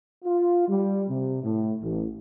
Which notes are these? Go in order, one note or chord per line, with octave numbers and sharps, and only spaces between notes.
F4
G3
C3
A2
A1